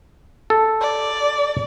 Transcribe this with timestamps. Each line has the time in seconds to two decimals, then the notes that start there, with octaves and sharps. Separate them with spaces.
0.50 A4
0.81 D5